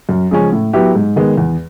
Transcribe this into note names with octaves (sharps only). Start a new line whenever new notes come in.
F#2
C#3 F3 G#3 C#4
A2
F#3 B3 E4 G4
G#2
D#3 G#3 B3
E2